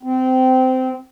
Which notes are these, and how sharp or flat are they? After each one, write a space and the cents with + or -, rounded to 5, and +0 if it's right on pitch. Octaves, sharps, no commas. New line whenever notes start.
C4 -20